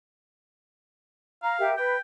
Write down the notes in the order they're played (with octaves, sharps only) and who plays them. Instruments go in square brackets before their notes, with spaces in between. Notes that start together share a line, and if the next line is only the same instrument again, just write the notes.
[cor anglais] F5 [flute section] A#5
[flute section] G4 A#4 E5
[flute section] B4 [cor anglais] G5